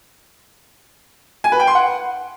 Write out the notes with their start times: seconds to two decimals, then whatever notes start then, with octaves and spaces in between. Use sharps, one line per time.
1.44 G#5
1.52 B4
1.60 G5
1.67 C6
1.75 F#5